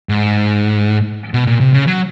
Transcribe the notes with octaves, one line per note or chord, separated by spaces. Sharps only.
G#2
B2
A#2
C3
C#3
F#3